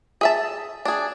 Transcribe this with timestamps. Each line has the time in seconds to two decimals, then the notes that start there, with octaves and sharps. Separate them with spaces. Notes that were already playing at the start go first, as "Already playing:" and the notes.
0.21 G#4 E5 A5
0.85 D4 G#4